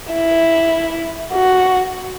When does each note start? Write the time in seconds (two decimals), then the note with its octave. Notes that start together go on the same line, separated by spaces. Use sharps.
0.13 E4
1.33 F#4